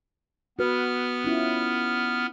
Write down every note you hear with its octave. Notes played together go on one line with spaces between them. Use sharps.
B3 F#4 B4 F6
C#4 E4 F4